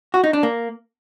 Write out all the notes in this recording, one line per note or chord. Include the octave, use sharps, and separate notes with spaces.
F#4
D#4
D4
A#3